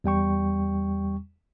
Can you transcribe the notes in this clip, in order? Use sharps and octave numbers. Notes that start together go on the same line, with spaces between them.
E2 G3 G5 C#6